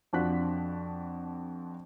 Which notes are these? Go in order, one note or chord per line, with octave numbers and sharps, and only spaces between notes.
F2 F3 D4 F#4 F#6 B6